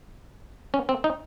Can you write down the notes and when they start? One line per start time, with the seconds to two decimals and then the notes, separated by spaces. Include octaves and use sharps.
0.74 C#4
0.89 C4
1.04 D#4